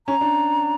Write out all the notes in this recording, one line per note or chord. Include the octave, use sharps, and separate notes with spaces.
C#4 A#5
D4